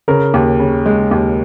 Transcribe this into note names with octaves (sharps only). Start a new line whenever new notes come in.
C#3 A#4
D#2
C#3
G#3
D#2